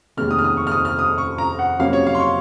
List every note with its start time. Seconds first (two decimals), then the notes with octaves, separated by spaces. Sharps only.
0.17 F1 D#2 D#3 G#3 F6
0.31 D#6
0.39 F6
0.44 D#6
0.57 C#6
0.67 F6
0.72 D#6
0.85 F6
0.99 D#6
1.18 C#6
1.38 A#5
1.59 F#5
1.79 F2 C3 F#3 A#3 C#4 F5
1.93 C#5
2.07 F5
2.15 C6
2.20 C#6